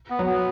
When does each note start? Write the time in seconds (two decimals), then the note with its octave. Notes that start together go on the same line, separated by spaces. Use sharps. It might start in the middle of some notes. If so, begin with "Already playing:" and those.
0.10 B3
0.19 F#3
0.26 B3